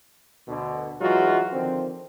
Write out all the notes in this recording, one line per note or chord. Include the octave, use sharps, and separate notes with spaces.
D2 B2 D3
E3 F#3 G#3 D#4 F4 F#4
D3 D#3 F3 C4